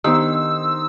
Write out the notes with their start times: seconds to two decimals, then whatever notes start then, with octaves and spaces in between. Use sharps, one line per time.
0.04 D#3 B3 D4 D#4 G4 C5 E6